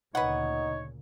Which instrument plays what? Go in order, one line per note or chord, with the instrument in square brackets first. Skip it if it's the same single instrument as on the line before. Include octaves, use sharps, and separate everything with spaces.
[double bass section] D2 A#2 C#3 [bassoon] D#4 [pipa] B4 F#5 [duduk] C#5